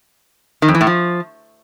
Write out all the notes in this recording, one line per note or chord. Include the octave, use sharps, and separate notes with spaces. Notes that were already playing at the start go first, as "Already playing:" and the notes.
D#3
F2
E3
A2
F3